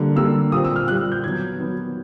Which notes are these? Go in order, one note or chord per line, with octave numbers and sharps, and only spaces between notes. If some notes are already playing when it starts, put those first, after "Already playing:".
Already playing: D3 G3 A#3
D3 G3 A#3 E6
A#2 G3 C4 D#6
E6
F6
A#2 G3 C4 F#6
G6
D#3 F#3 B3 G#6
D#3 F#3 B3